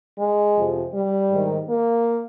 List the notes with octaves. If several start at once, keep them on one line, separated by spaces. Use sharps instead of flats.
G#3
F2 C3 F3
G3
G#2 D#3
A#3